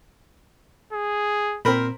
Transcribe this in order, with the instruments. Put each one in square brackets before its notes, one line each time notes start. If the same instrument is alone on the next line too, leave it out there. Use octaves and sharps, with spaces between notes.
[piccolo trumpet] G#4
[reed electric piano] A#2 C4 [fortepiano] A#4 C5 B5